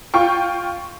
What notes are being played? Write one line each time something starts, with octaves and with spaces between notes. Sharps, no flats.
F4 G5 C#6